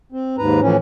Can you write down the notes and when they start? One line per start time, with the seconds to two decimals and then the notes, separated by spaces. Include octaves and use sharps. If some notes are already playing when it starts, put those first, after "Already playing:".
0.12 C4
0.38 D#2 G#2 B4 A#5
0.61 A2 E3 F3 C#4